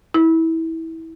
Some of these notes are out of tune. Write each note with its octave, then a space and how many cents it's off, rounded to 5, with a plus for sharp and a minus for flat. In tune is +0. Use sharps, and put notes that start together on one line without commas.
E4 -20